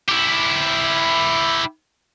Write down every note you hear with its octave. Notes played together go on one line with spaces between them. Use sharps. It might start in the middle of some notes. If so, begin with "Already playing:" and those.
E4 G4